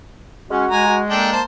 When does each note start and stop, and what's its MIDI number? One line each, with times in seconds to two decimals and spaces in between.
0.50 0.66 56
0.50 0.66 61
0.50 0.84 66
0.71 1.36 56
0.71 0.96 80
0.71 0.96 82
0.88 1.02 66
1.10 1.43 58
1.10 1.32 62
1.10 1.32 69
1.10 1.32 79
1.33 1.42 72
1.33 1.42 81